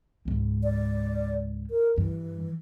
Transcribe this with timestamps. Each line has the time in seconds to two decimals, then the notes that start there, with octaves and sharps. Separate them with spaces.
0.25 C#2 G#2
0.64 D5
1.71 A#4
1.98 G2 E3